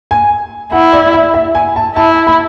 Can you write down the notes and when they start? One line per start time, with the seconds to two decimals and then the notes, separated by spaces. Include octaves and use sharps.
0.11 G#5
0.72 E4 F#5
0.93 D5
1.14 E5
1.34 E5
1.55 G#5
1.76 A5
1.95 E4 A5
2.27 B5